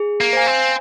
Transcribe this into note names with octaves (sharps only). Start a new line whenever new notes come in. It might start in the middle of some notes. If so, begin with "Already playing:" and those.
Already playing: G#4
A#3
C5 F5 G#5
C4